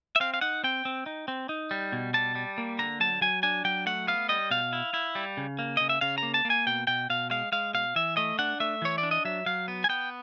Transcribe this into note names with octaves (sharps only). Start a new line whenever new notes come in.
E5
C4 F5
F5
D#4 F#5
C4 G5
C4
D#4
C4
D#4
G3
B2
G3 A5
G3
A#3
D3 A#5
F#3 A5
F#3 G#5
D4 G#5
F#3 G5
A3 F#5
B3 F5
G3 D#5
B2 F5
E4
E4
G3
C#3
A#3
C#3 D#5
E5
C#3 F5
A#3 A#5
A5
A#3
G#5
B2 G5
B2 G5
B2 F5
G#3 F5
G#3 F5
B2 F5
E3 E5
A3 D#5
D4 F#5
A3 E5
E3 C#5
D5
D4
D#5
F#3 E5
F#3 F5
B3
G#5
B3 G5